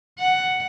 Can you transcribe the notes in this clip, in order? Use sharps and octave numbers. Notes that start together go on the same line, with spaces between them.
F#5